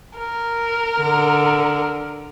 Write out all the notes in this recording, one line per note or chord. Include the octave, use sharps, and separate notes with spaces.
A#4
D3